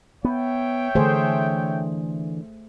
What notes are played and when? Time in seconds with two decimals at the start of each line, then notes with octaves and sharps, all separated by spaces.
0.25 B3 C#5 E5 G5
0.95 D3 E3 A3 G#4 C5